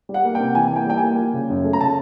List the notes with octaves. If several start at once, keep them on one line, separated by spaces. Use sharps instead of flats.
G3
F#5
A#3
G5
C3
E3 G#5
A#3
G5
G3 G5
G#5
A#3
F3
C#3
F#2
A3
A#5
C#3 A5